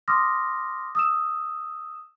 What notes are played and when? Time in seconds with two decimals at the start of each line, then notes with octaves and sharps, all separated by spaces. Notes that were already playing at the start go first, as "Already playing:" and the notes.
0.08 C6 D6 D#6 F6 A#6
0.95 D#6 E6 E7